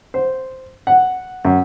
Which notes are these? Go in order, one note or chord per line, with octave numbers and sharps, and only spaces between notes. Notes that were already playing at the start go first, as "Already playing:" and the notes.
C5
F#5
F#2